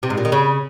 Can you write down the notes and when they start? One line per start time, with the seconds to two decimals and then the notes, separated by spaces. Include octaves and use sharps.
0.03 C3
0.10 G#2
0.18 A#2
0.25 D#3
0.32 C#3